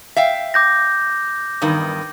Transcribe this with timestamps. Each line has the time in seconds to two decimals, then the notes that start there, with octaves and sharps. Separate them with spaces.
0.16 E5 F5 G5
0.54 D6 G6 A#6
1.62 E2 G2 D#3